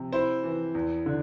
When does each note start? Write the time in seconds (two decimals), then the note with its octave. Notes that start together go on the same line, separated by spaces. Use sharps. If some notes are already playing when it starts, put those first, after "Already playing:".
Already playing: C3 F3
0.13 E4 C5
0.44 E3
0.75 E2
1.06 D3